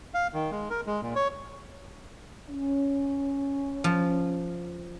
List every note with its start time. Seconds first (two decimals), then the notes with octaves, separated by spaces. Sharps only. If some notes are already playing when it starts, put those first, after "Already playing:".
0.14 F5
0.33 D#3
0.51 G#3
0.70 A#4
0.86 G#3
1.02 A#2
1.15 C#5
2.50 C#4
3.84 F3